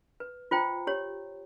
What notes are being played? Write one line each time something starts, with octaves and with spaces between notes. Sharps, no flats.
B4
F4 C5 G5 A#5
G4 C#5